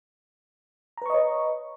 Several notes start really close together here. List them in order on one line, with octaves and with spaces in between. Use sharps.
A#5 B4 C#6 D#5 C#5